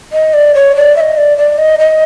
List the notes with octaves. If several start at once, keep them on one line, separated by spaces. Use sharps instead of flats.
D#5
D5
C#5
D5
E5
D#5
D5
D5
D#5
D#5